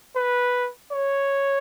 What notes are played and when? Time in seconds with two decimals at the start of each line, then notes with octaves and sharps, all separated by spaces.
0.16 B4
0.92 C#5